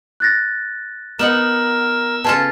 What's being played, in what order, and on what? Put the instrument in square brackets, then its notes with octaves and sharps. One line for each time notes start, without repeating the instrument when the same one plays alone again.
[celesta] F#6 A6 A#6
[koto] B3 D#4 F#5 [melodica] A#4 [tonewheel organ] E6
[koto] C#3 F4 A4 [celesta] B4 G#5 A5